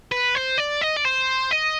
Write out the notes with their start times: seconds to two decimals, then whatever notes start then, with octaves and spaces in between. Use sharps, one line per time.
0.12 B4
0.35 C5
0.58 D5
0.81 D#5
0.96 D5
1.04 C5
1.51 D#5